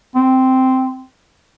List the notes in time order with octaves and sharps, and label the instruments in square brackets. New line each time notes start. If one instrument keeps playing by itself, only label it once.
[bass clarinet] C4